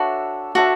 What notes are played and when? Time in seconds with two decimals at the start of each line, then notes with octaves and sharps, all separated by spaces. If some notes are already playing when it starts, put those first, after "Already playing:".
Already playing: D4 F#4 A4 C#5 E5
0.55 D4 F#4 A4 C#5 E5